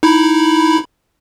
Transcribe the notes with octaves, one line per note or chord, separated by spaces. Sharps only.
D#4 E4 B5